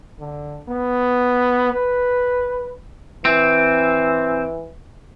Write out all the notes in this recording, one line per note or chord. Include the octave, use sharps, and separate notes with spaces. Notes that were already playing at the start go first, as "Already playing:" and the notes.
D3
B3
B4
E3 C4